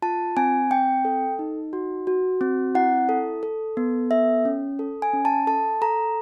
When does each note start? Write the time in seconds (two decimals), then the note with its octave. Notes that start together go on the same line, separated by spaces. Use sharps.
0.02 F4 A5
0.37 C4 G#5
0.71 C4 G5
1.05 A4
1.39 D#4
1.73 F#4
2.07 F#4
2.41 C4
2.75 E4 F#5
3.09 A4
3.43 A4
3.77 B3
4.11 A4 E5
4.45 C#4
4.79 A4
5.02 G#5
5.13 C#4
5.25 A5
5.47 A4 A5
5.82 A4 A#5